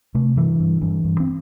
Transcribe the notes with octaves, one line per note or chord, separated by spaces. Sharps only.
C3 A3
G2 E3
G2
G2 E3
G2
C4